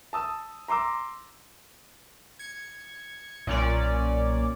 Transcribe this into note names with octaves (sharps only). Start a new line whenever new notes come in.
A5 D#6 E6
A#5 C6 D6 E6
G#6 C#7
B1 A#2 C#4 D5